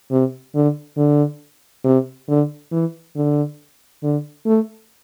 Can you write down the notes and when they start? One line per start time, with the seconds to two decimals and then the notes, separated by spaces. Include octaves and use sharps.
0.10 C3
0.55 D3
0.97 D3
1.85 C3
2.28 D3
2.72 E3
3.16 D3
4.03 D3
4.46 A3